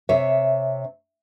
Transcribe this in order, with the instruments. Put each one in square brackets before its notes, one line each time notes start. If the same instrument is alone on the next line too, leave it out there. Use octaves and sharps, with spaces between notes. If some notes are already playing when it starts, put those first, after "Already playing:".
[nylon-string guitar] C3 C#5 E5